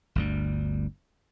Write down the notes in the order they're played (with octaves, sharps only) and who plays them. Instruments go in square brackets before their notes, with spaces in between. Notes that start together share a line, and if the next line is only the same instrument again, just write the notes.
[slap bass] G1 D2 G3